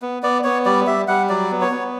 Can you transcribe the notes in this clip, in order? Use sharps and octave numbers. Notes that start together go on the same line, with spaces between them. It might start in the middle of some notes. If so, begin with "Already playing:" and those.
B3
B3 D5
B3 C#5
G3 D5
G3 E5
G3 F#5
F#3 D5
B3
C#5
B3